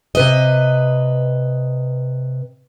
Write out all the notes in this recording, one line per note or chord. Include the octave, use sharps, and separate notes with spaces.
C3 B4 D#5